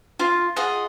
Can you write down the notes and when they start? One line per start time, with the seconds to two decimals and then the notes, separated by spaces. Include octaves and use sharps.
0.19 F4
0.56 F4 G#4 D#5 F#5